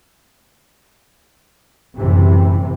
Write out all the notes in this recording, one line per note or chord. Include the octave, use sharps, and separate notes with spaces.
F#1 A2 C3 E3